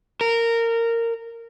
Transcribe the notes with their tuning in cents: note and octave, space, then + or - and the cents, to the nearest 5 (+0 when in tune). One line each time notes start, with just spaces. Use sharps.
A#4 -15